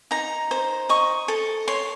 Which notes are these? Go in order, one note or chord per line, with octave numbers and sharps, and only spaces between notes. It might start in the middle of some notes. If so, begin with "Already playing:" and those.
D#4 A#5
C5
D#5 C#6
A4
C#5 C6